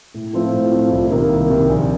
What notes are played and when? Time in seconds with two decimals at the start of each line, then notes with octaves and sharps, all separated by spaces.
0.14 A2
0.33 F3 A3 C4 F4
0.53 A2
0.72 F3 A3 C4 F4
0.91 C2
1.11 C3 D#3 A#3
1.30 C2
1.50 C3 D#3 A#3
1.69 A#1